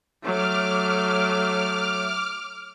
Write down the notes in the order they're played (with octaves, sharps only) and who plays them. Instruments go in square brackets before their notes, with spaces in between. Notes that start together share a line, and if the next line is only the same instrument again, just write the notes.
[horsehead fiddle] F#3 A3 [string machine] D6 F6